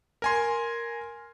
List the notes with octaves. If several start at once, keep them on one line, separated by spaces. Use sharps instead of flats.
A#4 G#5 C6